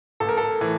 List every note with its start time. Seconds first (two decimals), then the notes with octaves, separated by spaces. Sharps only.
0.20 A1 A4
0.29 A#4
0.37 A4
0.61 A2 E3